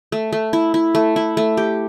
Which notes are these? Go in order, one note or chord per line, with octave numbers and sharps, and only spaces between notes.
A3
A3
E4
E4
A3
E4
A3
G4